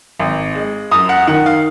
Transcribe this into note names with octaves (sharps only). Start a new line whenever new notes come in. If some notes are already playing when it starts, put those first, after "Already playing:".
G#1
G#3
F#2 D#6
F#5
D#3 F#5
F5